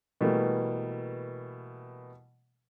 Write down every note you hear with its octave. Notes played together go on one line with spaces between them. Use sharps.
B2 E3 G3 A3 A#3